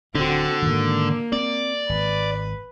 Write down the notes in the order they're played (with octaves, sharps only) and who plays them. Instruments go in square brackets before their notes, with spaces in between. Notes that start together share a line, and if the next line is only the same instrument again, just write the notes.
[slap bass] D1 D4 [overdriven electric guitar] D3 [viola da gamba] C4 F#4
[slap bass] G#2 D#3 [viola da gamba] A#3
[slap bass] C4 [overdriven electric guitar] D5
[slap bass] G#1 [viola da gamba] B4